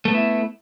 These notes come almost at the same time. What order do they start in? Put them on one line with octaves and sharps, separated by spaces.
A3 B3 E4